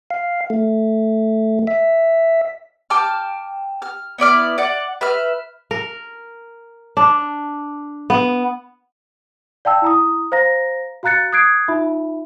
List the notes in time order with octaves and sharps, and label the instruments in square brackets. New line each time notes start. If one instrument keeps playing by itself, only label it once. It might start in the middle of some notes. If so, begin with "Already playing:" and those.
[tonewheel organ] F5
A3
E5
[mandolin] G5 A5 D6 F6
F6
B3 E4 D5 F6
D5 F#5
B4 E5 F6
[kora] A#4
D4
B3
[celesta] D5 F5 G5 A5 E6
E4 A#5 D#6
C5 F5 A#5 A#6
F#4 F5 A#5 F#6 A6 C#7
D#6 F#6 G#6 C7 D7
D#4 F4 E5 B5